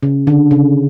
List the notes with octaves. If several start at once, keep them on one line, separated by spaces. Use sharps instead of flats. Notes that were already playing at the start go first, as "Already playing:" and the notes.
C#3
D3
C#3